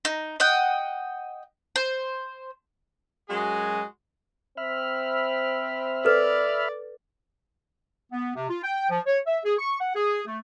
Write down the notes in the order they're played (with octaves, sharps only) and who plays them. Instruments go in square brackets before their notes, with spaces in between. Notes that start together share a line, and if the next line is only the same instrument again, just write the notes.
[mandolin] D#4
D#5 F#5 G5
C5
[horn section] F#2 G#3 F#4 G#4 G#5
[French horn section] C4 C5 [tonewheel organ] E5 B5 F6
[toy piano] A4 B4 [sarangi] D5
[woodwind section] B3
C3
F4
G5
F3
C#5
E5
G#4
C#6
F#5
G#4
A3